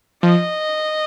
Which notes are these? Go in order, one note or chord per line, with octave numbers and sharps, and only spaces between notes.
F3 D#5